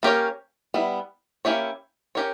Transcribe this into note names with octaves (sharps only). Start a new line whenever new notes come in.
A#3 C#4 G4 A#4 C#5
G3 B3 E4
A#3 C#4 E4 G4 C#5
C#4 G4 A#4 C#5